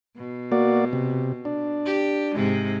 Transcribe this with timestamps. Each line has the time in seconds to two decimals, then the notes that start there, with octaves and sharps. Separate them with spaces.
0.16 B2
0.52 A#3 F#4 D5
0.93 C3
1.45 D4
1.85 G4
2.34 G#2 C3 G#3